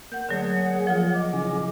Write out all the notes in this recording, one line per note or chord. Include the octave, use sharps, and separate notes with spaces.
A#3 F#5 G6
D3 F#3 A3 G#4 C#5 F#5
F3 F4
D#5 D6
C#3 E3 G#4